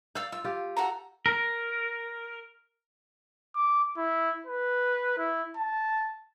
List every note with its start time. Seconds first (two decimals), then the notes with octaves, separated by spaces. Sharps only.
0.15 D5 F5 E6 G6
0.32 F4 E6
0.44 F4 G4
0.77 F#4 A4 A#5
1.26 A#4
3.56 D6
3.98 E4
4.47 B4
5.18 E4
5.57 A5